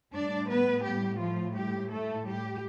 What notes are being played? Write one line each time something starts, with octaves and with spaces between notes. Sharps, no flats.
A2 G3 D4 D5
B3 B4
G3 G4
F3 F4
G3 G4
A3 A4
G3 G4